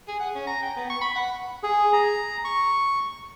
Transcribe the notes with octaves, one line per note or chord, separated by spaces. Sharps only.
G#4
F#5
C#4
A#5
G5
B3
C#6
B5
F#5
G#4
A#5
C#6